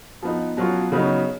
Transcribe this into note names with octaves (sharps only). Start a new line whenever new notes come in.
F3 B3 D#4
B2 F#3 C#4 F4
C#3 F#3 B3 D#4